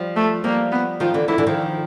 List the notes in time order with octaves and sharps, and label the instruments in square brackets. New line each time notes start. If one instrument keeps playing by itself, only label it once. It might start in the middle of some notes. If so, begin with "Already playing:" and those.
Already playing: [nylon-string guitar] F3 G3
[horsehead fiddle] A3
[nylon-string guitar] F3 G3 [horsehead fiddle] A#3
[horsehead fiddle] B3
[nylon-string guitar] D#3 F3 [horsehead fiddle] F4
[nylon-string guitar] D3 E3
[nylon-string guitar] D3 E3 [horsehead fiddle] E4
[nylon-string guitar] D3 E3
D#3 F3